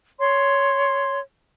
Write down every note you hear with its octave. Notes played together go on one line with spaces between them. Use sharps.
C#5 C6